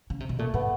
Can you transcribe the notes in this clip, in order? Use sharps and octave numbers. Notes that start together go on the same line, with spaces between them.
C#3
C3
B2
A#2 A3
A2 B3